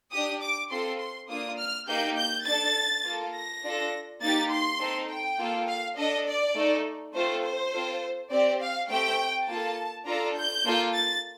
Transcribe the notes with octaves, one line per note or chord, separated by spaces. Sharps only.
D4 G4 D#6
D6
C4 F4 A4 C6
C6
A#3 D4 F4 D#6
F6
A#3 D#4 G4 G6
G6
D4 A4 A6
A#3 F4 A4
A#6
D4 F4 A4
A#3 D#4 G4 A6
C6
C4 D#4 A4
G5
A#3 F4 A4
F5
D4 A4 D#5
D5
A3 D#4 A4
A3 C4 F4 A4 C5
C5
C4 F4 A4
C4 G4 D5
F5
A3 C4 G4 G5
A#3 F4 A4 A5
D4 F4 A4 A#5
G6
A#3 F4 A4
A6